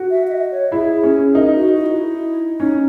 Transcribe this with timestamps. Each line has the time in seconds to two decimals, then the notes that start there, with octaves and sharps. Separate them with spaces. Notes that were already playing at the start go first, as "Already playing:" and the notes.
Already playing: F#4
0.10 E5
0.27 E5
0.31 D#5
0.52 C#5
0.72 E4 G#4
1.03 C#4
1.35 D#4 A#4
1.55 F#4
1.77 E4
1.86 F#4
1.97 E4
2.59 C#4 D#4